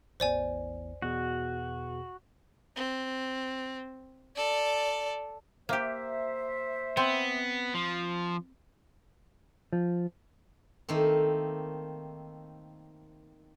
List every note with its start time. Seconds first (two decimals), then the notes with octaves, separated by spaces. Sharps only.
0.20 A1 E2 C5 D5 G#5
1.02 E2 B2 F#4 G#4
2.76 C4
4.36 A4 D5
5.69 A#3 G4 C5 E5
6.97 B3 C4
7.74 F3
9.73 F3
10.89 D#3 A3 A#3 C4